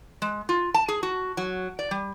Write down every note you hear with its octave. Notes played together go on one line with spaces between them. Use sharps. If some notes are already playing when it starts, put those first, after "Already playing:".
G#3
F4
A5
G#4
F#4
F#3
D5
G3